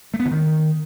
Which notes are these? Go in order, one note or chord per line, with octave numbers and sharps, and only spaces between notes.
A3
B3
D3
D#3